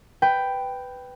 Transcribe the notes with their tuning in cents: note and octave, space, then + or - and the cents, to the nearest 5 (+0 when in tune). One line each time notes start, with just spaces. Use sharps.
B4 +10 G5 +0